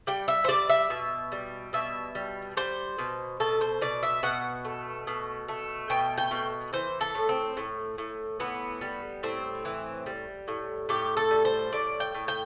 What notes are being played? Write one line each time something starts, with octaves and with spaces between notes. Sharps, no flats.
G3 G5
E5
C5
G3 D5
E5
B2
G3
B2 E5
G3
G3 C5
B2
B2 A4
C5
B2 D5
E5
B2 F#5
A3
B2
A3
B2 G5
G5
B2
E3 C5
A4
A2
C4
A2
A2
E3 B3
G3
A2 C4
E3
G3
A2
A2 G4
A4
G3
C5
A2 D5
G5
A2
G5